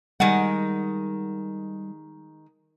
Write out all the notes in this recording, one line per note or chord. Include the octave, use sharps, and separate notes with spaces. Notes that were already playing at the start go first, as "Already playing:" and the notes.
D#3 G3 G#3 F#5